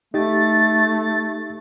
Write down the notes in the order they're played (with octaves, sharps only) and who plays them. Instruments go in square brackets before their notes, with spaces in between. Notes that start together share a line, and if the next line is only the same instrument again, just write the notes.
[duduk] A3 [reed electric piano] D#4 G4 [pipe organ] A6